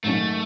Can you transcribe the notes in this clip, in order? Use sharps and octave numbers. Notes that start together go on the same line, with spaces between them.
G#2 D#3 F#3 A3 C#4